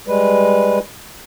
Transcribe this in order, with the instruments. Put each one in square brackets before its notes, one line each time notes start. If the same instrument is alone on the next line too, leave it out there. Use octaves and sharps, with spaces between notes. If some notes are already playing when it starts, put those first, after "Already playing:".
[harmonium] G3 G#3 B4